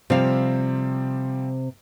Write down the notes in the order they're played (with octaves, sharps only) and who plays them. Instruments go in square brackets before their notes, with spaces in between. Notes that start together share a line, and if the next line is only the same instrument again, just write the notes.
[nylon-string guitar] C3 F5 [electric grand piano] F3 G3 C4